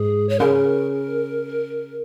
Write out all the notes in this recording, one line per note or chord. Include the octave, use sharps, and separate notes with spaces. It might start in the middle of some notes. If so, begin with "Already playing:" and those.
Already playing: G#2 G#4
C#5
C#3 A#4